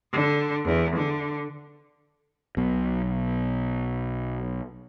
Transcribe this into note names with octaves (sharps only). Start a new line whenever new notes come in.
D3
E2
D3
B1 B2